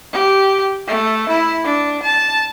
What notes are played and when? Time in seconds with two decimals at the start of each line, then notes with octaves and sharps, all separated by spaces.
0.13 G4
0.87 A3
1.29 E4
1.64 D4
2.03 A5